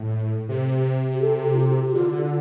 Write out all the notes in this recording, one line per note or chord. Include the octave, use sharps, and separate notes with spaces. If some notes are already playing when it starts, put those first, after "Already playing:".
Already playing: A2
C3
G4
A4
F4
G4
G4
D3 F4